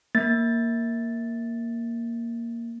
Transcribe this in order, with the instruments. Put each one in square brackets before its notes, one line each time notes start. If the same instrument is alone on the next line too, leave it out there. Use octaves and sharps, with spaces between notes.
[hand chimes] A#3 A6